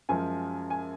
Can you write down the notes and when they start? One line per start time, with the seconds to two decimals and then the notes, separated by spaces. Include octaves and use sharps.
0.09 F#2 F3 G#3 G#5
0.70 G#5